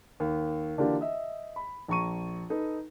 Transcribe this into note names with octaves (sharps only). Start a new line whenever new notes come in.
D#2
D3 E3 A#3 D4 F4 G4
D#5 E5
B5
A#1 A#5 C#6 D#7
D#4 A4 B4